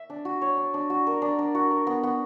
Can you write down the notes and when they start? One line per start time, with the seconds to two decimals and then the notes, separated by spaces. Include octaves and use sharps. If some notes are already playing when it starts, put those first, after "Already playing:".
Already playing: E5
0.10 D4
0.25 F#4
0.42 C#5
0.57 D4
0.74 D4
0.90 F#4
1.07 A#4
1.22 D4
1.38 D4
1.55 F#4
1.71 A#4
1.87 B3
2.03 B3